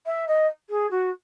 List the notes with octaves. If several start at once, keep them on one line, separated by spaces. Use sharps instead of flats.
E5
D#5
G#4
F#4